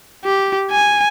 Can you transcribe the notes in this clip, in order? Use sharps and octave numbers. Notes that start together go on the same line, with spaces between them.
G4
G#5